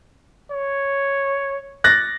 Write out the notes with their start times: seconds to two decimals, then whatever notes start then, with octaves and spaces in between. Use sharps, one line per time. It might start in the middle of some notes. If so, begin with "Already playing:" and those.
0.51 C#5
1.84 F#6 A6 A#6